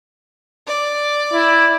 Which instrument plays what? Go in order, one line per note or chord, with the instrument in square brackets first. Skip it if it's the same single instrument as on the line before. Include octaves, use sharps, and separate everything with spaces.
[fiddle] D5
[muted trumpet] E4